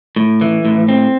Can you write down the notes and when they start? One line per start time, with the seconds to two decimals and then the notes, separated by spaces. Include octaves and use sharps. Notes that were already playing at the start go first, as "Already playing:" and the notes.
0.16 A2
0.41 E3
0.65 A2
0.88 C4